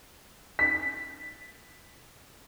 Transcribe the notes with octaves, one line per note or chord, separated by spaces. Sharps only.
B6